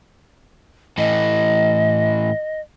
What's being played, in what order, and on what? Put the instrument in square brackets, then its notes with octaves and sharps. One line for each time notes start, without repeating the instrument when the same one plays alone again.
[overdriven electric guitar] A2 E3 [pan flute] D#5